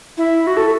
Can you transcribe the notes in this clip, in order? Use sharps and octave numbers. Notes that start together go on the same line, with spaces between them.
E4
F#4
A4